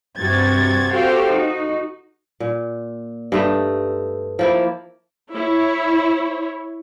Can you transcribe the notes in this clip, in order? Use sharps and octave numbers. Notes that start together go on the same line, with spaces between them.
G2 C3 F#4 G#6 A6
F#4 G4 A4 C5 F5 G5
D#4 F#4
A#2
G2 A3 D#4
F3 A#3 E4
E4 C#5